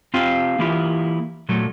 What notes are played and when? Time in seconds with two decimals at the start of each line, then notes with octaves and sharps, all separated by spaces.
0.14 C4 F4 G4 F5
0.59 E3 A#3 E4 F4 G4
1.49 A#2 F#3 A3